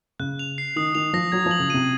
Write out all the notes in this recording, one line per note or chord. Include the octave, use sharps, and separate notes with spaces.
C#3 F#6
F7
C7
D#3 D#6
D#3 F7
F3 A#6
F#3 G#6
F3
F#7
C#3
C3 D#7